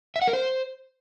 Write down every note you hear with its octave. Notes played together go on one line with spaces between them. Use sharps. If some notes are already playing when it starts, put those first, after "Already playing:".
E5
F#5
A#4
C5